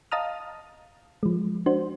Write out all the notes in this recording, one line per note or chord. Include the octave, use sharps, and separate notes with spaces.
D#5 F5 A5 A#5 D#6 F6
F3 G#3
D4 F#4 C5